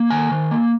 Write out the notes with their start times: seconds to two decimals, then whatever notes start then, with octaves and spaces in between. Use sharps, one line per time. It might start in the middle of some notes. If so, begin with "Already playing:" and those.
Already playing: A#3
0.11 D#3 G#5
0.31 D#3
0.51 A#3